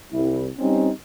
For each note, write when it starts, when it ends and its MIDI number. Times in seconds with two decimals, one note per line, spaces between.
0.12 0.46 36
0.12 0.46 64
0.59 0.90 55
0.59 0.90 60
0.59 0.90 61
0.59 0.90 63